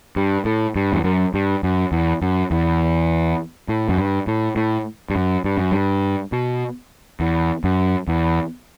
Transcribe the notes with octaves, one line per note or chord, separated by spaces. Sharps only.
G2
A2
G2
E2
F#2
G2
F#2
E2
F#2
E2
A2
F#2
G2
A2
A2
G2
F#2
G2
F#2
G2
B2
E2
F#2
E2